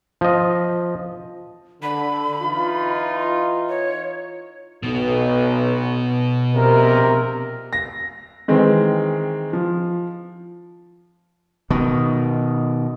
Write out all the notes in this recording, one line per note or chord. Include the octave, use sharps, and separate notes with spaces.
F3 D#5
D3 B5
E3 D#4 F4
C#5
B1 B2 B3
A#1 C3 A#4
A#6
D#3 E3 G#3 C4
F3
B2 D#3